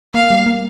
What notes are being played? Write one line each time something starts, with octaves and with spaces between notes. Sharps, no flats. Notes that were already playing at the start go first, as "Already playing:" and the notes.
A#3 F5
G3
A#3